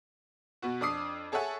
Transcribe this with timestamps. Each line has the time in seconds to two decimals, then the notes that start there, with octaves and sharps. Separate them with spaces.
0.62 B2 B3 F#4
0.81 F2 D4 D6 D#6 C7
1.32 G#4 A4 C#5 E5 F#5 G#5